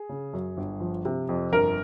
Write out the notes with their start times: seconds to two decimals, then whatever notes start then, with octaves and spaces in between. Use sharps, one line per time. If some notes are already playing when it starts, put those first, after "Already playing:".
Already playing: G#4
0.09 C#3
0.33 F#2
0.57 G1
0.80 F3
1.05 C3
1.29 F2
1.52 G1 A#4